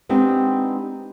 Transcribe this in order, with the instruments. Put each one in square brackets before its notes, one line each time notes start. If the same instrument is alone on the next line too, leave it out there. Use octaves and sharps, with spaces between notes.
[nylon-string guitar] G#3 B3 C4 D4 D#4 G4